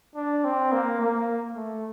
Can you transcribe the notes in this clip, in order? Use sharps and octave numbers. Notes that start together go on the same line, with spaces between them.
D4
C4
A#3
A#3
A3